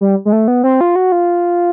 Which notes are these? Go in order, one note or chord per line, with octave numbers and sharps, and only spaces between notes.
G3
G#3
A3
B3
C4
F4
F#4
F4